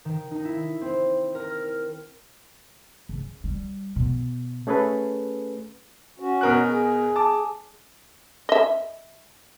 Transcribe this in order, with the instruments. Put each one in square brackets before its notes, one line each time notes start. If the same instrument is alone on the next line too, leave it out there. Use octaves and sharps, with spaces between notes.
[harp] D#3
D#4
E4
C4
A#4
F6
[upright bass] C#3
G3
B2
[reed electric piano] A3 C#4 G#4 A4 B4
[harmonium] C#4 F#4
[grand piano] B2 A#4 F#6
[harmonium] G#4
[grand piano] A5 D6
[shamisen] D#5 E5